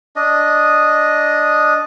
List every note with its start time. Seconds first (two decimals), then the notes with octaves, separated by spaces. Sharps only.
0.16 D4 D#5